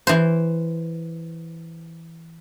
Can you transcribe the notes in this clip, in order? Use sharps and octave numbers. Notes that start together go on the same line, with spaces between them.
E3 C5